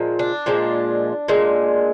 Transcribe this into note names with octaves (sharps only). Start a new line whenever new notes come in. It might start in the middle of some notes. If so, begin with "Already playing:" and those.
Already playing: A#2 F3 G#3
D4
A#2 F3 G#3
A#2 G#3